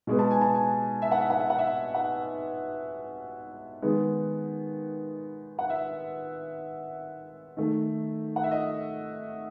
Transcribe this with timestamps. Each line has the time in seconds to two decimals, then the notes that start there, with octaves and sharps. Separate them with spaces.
0.07 B2 G#3 B3
0.19 A5
0.30 G#5
0.41 A5
0.54 G#5
1.02 E5
1.12 F#5
1.21 E5
1.30 F#5
1.40 E5
1.50 F#5
1.58 E5
1.94 F#5
3.82 D#3 G#3 B3
5.59 F#5
5.70 E5
7.57 D#3 A3
8.36 F#5
8.44 E5
8.51 D#5